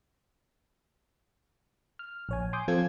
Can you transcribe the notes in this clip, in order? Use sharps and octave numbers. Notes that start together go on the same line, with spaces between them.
F6
A#1 C#5 G#5
G#5 C6 D6 D#6 G6
F3 C4 F4 A4 G#6